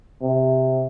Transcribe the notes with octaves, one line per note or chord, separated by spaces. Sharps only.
C3